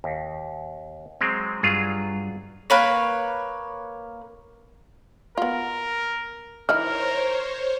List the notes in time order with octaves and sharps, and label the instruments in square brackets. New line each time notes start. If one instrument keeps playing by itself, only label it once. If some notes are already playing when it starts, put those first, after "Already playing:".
[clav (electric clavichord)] D#2
F#3 G#3 C4
[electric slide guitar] G2 [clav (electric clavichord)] F#3 F4 G#4
[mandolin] A#3 B4 C#5
[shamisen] B3 F4 [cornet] A#4
[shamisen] E3 D#4 E4 [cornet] A#4 [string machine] C5 C#5 [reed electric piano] F6